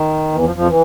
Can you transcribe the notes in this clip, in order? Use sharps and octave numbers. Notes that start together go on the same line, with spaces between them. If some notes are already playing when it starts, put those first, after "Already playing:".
Already playing: D#3
E2 E3
F2 F3
F2 F3
E3